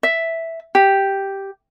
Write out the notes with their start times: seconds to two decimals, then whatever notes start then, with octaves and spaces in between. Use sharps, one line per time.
0.03 E5
0.75 G4